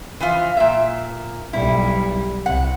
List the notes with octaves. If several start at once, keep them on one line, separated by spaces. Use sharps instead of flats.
E3 F3 F4
A#2 E5
B1 G3 E4
C2 F#5